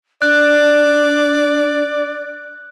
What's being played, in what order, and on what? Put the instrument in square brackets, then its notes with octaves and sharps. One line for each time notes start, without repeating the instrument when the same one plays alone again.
[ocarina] D4 [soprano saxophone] D5 [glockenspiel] F#6